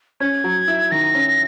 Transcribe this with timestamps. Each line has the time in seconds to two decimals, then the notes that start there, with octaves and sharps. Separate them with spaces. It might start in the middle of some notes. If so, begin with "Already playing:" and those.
0.20 C#4 G#6
0.44 F#3
0.68 E4
0.91 D#3 A#6
1.15 C#4